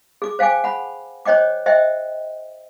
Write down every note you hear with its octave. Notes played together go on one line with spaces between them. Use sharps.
G#4 D6
C5 F5 G5 G#5 D6
F#5 B5
C5 C#5 D#5 G5 D6
C5 D#5 E5 G5